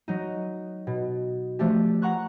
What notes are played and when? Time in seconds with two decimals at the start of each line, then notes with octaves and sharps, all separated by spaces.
0.08 F#3 D#4
0.87 B2
1.59 F3 A3 D4 G4
2.02 F#5 A#5 C#6 F#6